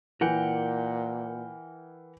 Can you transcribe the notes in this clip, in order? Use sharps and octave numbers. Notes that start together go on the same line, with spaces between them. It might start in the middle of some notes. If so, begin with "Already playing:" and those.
A#2 E3 A#4 F#5 G5